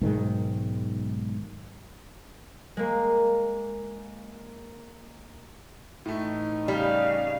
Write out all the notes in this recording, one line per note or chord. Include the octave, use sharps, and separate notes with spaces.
B1 G#2 D#3 G#3
G#3 A#3
A1 A2 A3 D#4
C#3 G3 F5